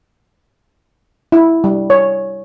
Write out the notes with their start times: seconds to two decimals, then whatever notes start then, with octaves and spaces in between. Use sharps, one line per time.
1.32 E4
1.64 G3
1.90 C#5